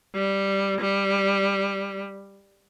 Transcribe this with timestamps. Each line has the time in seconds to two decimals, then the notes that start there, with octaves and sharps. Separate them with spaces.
0.14 G3
0.80 G3